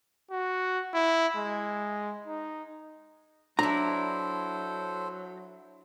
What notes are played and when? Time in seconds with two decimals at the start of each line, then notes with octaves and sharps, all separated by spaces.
0.31 F#4
0.94 E4
1.36 G#3
2.27 D#4
3.59 F#3 D4 E4 A4 C5 A#5